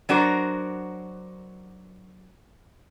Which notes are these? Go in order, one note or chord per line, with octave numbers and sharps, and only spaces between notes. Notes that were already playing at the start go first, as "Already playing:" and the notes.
F#3 D4 F#4 A#4 C5